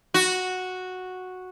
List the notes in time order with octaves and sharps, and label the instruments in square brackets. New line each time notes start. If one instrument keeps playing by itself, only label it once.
[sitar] F#4